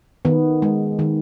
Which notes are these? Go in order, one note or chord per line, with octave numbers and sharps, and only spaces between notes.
D#3 B3
G#3
D#3